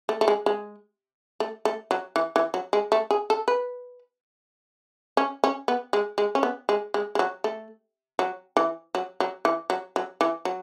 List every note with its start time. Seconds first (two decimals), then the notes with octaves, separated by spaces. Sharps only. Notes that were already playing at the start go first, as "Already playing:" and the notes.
0.09 A3
0.21 A3
0.28 G#3
0.46 G#3
1.40 A3
1.65 A3
1.91 F#3
2.16 E3
2.36 E3
2.54 F#3
2.73 G#3
2.92 A3
3.11 G#4
3.30 A4
3.48 B4
5.17 C#4
5.44 C#4
5.68 B3
5.93 G#3
6.18 G#3
6.35 C#4
6.43 B3
6.69 G#3
6.94 G#3
7.15 G#3
7.19 F#3
7.44 A3
8.19 F#3
8.57 E3
8.95 F#3
9.20 F#3
9.45 E3
9.70 F#3
9.96 F#3
10.21 E3
10.45 F#3